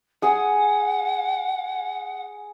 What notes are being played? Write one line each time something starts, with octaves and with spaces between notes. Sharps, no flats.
G#4 F#5 G#5